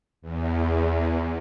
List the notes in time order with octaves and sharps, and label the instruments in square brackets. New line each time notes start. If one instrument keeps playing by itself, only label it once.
[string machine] E2